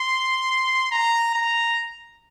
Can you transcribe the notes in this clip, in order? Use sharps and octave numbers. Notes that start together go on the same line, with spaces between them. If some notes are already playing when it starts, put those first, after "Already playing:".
Already playing: C6
A#5
A#5